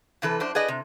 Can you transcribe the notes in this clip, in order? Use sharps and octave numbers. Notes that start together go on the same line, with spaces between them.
C3 E3 A4 B4
F#2 D4 C5
G#4 B4 D5 D#5
C3